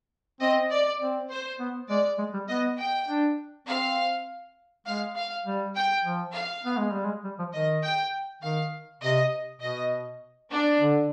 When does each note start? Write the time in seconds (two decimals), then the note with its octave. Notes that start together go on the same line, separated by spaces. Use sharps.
0.41 C4 D#5
0.71 D5
1.00 C4
1.30 C5
1.60 B3
1.89 G#3 D5
2.19 G#3
2.34 G3
2.48 B3 D#5
2.78 G5
3.08 D4
3.67 C4 F5
4.86 G#3 F5
5.17 F5
5.45 G3
5.76 G5
6.04 F3
6.35 F5
6.64 B3
6.78 G#3
6.92 G3
7.05 G#3
7.24 G3
7.39 F3
7.53 D#3 D#5
7.83 G5
8.42 D#3 F5
9.02 C3 D#5
9.61 B2 D#5
10.50 D4
10.80 D3